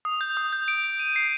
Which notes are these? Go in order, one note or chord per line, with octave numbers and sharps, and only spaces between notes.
D#6
G6
D#6
G6
D7
D7
D#7
C7